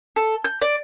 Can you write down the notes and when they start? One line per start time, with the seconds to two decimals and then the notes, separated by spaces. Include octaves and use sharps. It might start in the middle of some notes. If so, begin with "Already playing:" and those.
0.16 A4
0.44 G6
0.62 D5